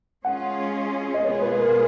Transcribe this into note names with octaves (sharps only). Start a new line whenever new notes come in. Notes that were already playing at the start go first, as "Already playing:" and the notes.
G#3 C#4 F4 G#4 F#5
D#5
B2 G#3 B3 F4 G#4 C#5
B4
A#4